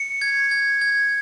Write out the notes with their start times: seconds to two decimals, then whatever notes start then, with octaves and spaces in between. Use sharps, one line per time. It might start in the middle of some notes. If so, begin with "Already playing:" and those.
Already playing: C#7
0.21 G#6
0.51 G#6
0.81 G#6